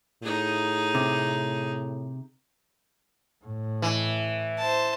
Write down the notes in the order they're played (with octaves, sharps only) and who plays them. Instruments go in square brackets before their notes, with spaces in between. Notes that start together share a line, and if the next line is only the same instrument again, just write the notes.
[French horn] A2 [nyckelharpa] D#4 G#4
[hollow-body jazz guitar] C3
[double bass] A2
[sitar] E3
[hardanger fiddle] C5 A5